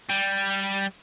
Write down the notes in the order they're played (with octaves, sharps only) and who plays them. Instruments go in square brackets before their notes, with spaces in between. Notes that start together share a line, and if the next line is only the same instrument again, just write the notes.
[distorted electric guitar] G3